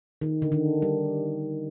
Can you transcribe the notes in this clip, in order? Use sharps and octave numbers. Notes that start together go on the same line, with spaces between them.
D#3
D3
D#3
G3